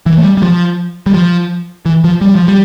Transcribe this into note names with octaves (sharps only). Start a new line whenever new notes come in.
E3
A3
G3
G3
F3
G3
F3
E3
F3
G3
F3
G3